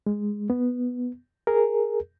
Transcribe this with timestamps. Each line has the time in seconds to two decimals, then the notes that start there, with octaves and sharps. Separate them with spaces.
0.07 G#3
0.50 B3
1.47 G#4 A#4